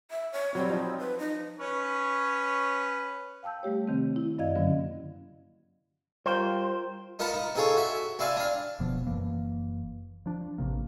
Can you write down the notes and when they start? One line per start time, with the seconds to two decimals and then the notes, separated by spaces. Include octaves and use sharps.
0.11 E5
0.32 C#5
0.55 F#3 G3 C4
0.69 F3 D#4
0.98 B4
1.18 D#4
1.59 C#4 B4 C#5
3.43 F5 G5 A5 E6 G6
3.63 G3 A3 G4 C#5
3.88 C3 D#3 C4
4.16 E4
4.38 F#2 D5 D#5 F5 G#6
4.55 G2 D3 F#3 A#3 C#4
6.26 G3 F4 A#4 C5 G5
7.19 D#4 F4 A#4 F#5 A5 B5
7.33 D#4
7.55 C4 D#4 F4 G#4 A4 C#5
7.77 F#4 E5
8.19 C4 E4 D5 F5 G#5
8.37 D4 F5
8.79 E1 B2 F3 B3
9.07 F#1 E3 A#3
10.26 F3 D4
10.58 A1 C3 A#3